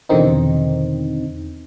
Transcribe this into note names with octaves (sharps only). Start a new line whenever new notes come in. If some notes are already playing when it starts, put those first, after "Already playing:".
E2 B2 D3 D#3 C4 D#4